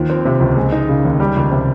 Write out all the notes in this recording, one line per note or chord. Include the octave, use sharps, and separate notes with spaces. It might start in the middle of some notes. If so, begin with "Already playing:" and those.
Already playing: D#2 F3
C4
C3
C#2
G#3
D#4
C#3
D#2
G3
C#2
C3